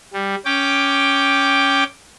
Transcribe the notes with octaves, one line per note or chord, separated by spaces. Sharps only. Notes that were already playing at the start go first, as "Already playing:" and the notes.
G3
C#4 G5 D6